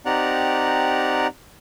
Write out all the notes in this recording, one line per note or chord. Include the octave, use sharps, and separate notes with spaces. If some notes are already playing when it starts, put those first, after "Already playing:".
C4 D#4 G4 D5 F#5 A#5